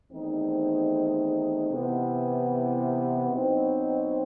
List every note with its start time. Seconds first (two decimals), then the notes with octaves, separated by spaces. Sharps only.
0.12 E2 D#3 A3 C4 D#4
1.71 C3 E3 B3 E4
3.30 B2 F#3 C4 D#4